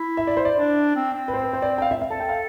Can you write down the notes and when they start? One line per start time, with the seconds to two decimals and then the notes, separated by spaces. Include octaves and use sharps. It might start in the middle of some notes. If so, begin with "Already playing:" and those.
Already playing: E4
0.17 E5
0.27 D5
0.37 C5
0.45 D5
0.56 D4
0.95 C4
1.14 C4
1.28 B4
1.34 C5
1.44 B4
1.53 C5
1.62 D5
1.78 G5
1.82 F5
1.91 E5
2.02 E5
2.11 A4 A5
2.20 G5
2.29 F5